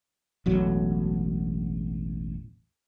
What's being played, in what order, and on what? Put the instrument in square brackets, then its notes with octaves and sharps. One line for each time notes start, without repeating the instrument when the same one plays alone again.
[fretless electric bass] E1 A1 F#3